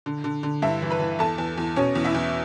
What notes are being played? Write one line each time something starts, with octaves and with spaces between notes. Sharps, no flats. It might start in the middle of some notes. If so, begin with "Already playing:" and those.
D3
D3
D3
G2 E4 E5
E3
B4 B5
E3
E2 A4 A5
E2
E2
B2 C#4 C#5
E2
E4 E5
E2